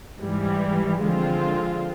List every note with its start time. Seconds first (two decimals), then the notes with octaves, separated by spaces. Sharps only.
0.20 G#2 E3 G3
1.02 D3 F3 G#3 C4 F4